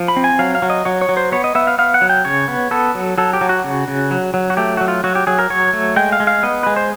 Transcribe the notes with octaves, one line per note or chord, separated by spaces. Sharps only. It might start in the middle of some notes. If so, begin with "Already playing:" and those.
Already playing: F3
B5
C4
G#5
F#3 F5
F5
F#3
D#5
F#3 C#5
C#5
F#3
C5
B3 C#5
D#5
B3 E5
F5
B3 F5
F#5
F#3
G5
C#3 C#5
B3
B3 A4
F#3
F#3 A4
G4
F#3
F#4
C#3
C#3
F#3
F#3
F#4
A3 G4
F#3 F#4
F4
F#3 F#4
G4
F#3 G#4
A#4
F#3 C#5
A3
G#3 G5
F5
G#3
F5
B3 D#5
G#3 B4
C5